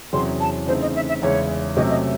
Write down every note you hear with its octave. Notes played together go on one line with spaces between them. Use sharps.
E2 C3 F#3 C#4 G#4 C6
A5
C#3 E3 A3 C4 D#4 C5
D#5
E5
E5
E2 C#3 G#3 C#4 E4 C#5
C3 F#3 A3 C#4 D#5
D#5